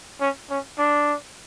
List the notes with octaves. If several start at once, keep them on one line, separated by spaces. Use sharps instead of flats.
C#4
C#4
D4